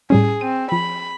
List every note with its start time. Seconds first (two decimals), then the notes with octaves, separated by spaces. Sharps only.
0.10 A2 G3 C#4 G#4
0.41 C4 D#7
0.72 F3 B5